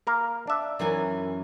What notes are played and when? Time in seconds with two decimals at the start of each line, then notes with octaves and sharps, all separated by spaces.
0.07 A#3 A#4 F5
0.47 D4 E5
0.79 F#2 E3 G#5